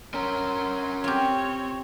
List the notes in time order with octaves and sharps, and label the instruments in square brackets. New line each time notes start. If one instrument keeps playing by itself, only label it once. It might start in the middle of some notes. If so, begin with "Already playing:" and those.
[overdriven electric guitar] C#4 A#4 [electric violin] C6
[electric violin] C4 C#5 [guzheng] F4 G4